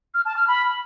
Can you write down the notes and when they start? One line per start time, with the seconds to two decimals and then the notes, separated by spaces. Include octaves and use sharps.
0.14 F6
0.25 A5
0.37 F6
0.48 B5